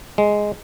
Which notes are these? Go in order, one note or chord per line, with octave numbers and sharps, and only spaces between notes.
G#3